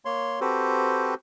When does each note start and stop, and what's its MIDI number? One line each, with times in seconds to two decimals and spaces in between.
0.05 0.40 58
0.05 0.40 73
0.05 0.40 84
0.41 1.14 60
0.41 1.14 66
0.41 1.14 67
0.41 1.14 69
0.41 1.14 71
0.41 1.14 72